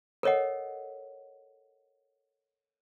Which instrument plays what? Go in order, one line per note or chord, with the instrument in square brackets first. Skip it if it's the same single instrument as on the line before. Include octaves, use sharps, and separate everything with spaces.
[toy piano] A4 A#4 C#5 D#5 F#5